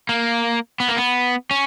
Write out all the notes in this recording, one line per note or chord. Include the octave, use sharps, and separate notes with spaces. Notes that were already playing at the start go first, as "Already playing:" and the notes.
A#3
B3
A#3
B3
C#4